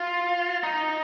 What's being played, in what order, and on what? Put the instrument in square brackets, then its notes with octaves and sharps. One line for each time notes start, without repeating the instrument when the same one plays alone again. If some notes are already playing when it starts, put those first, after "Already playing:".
Already playing: [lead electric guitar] F4
D#4